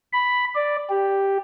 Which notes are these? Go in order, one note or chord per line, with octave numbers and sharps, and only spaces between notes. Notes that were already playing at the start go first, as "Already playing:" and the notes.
B5
D5
G4